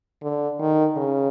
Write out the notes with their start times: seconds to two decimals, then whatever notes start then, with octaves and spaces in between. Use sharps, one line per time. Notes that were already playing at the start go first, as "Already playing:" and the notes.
0.23 D3
0.59 D#3
0.97 C#3